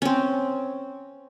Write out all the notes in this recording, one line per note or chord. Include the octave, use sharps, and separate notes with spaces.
C4 C#4